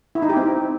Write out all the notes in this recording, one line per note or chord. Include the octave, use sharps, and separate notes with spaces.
E4
D#4
G4
C4